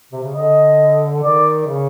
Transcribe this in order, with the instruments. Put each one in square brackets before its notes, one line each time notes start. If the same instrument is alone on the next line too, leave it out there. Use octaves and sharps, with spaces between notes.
[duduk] C3
C#3
[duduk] D3 [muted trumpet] D#5
[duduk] D#3 [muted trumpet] D5
[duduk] C#3